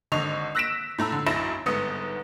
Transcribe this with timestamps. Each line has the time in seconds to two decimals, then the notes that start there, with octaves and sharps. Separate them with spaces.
0.12 G#1 D3 D#5 C#6 F7
0.55 E6 F#6 A#6 B6 D7 E7
0.98 A2 A3 A#5 E6
1.12 D3
1.26 B1 F#2 E4 B5 A#6 E7
1.66 G1 G#2 B3 D#6 C#7